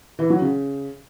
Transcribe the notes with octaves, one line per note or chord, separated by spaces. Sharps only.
E3
F#3
C#3